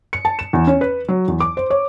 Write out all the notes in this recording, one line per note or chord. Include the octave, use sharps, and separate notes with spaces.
C#7
A5
E7
E2
C#4
B4
F#3
E2
D6
C5
C#5